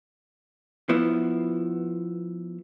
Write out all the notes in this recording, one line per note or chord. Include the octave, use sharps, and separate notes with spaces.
F3 B3 E4